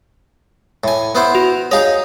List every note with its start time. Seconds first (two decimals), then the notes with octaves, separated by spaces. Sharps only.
0.84 A2 G#5
1.15 B3 E4 C5
1.35 F#4 F7
1.71 D#4 G#4 C#5 D#5 F5